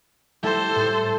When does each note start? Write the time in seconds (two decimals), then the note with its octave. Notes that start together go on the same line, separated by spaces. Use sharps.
0.43 G3 A3 E4 A4 C5
0.76 A2